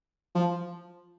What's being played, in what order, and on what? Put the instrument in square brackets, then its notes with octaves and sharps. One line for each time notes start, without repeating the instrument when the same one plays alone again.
[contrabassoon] F3